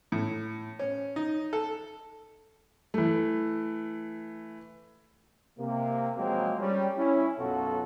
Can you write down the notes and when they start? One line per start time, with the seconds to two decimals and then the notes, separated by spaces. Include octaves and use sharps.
0.12 A2
0.79 C#4
1.16 D#4
1.53 A4
2.94 E3 A3
5.59 C3 A#3
6.16 F3 F#3 G#3 A#3 C4
6.60 G3 C#4
6.97 C#4 E4
7.38 B1 F#2 B2 F4 F#4 A4